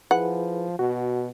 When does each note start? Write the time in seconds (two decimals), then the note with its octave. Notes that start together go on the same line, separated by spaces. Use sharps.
0.11 F3 E4 G#4 B4 F#5
0.79 B2 F#4